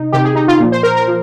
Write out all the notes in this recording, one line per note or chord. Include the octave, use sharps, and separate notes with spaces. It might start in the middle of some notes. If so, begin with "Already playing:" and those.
Already playing: C3 D#4
C3 D#3 G4
G#4
D#4
F4
A#2 F3
C5
A#4
A#4
F3